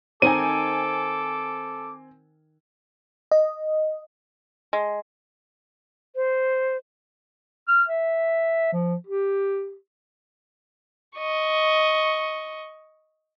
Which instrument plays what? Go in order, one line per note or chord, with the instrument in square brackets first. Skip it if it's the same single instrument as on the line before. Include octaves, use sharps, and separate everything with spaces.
[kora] D#3 D#4 [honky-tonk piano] C4 G#5 [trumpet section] A4 D6 [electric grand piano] D#7
[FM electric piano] D#5
[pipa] G#3
[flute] C5
[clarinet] F6
E5
F3
G4
[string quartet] D#5 C#6